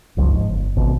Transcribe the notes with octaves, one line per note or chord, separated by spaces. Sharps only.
F#1 C#2 C3 F3
G#2
G1
G#1 B2